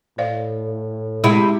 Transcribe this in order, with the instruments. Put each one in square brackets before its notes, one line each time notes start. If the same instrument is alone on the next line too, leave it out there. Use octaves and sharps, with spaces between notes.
[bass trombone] A2 [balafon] C5 D5 F5
[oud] C3 E4 [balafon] G#3 G#4